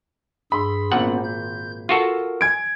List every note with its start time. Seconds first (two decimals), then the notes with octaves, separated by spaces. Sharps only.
0.52 G2 G#4 B5 C6 E6
0.92 G#1 A#2 B3 C#4 C5 F#5
1.24 G6
1.89 F4 F#4 A4 A#4
2.41 G#5 G#6 D7